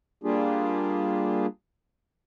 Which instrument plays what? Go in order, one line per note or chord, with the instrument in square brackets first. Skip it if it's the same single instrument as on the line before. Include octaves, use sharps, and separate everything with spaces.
[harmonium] G3 A#3 D4 F4 G4 G#4